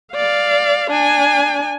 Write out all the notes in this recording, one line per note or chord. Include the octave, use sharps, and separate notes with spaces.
D5 F5
D4 G#5